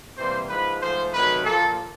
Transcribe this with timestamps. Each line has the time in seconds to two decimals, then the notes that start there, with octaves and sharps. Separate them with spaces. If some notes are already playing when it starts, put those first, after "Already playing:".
0.17 C3 E3 G3 A#3 C5
0.48 G#2 F3 G#3 B4
0.81 G#2 F3 A3 C5
1.13 C3 D#3 F#3 A3 B4
1.44 A#2 F3 A#3 A4